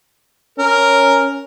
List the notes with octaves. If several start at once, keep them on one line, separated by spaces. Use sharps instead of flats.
C#4 A#4